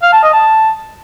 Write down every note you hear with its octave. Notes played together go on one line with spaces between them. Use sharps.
F5
A5
D#5
A5